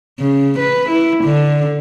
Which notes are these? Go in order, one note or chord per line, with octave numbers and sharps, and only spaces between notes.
C#3
B4
E4
D3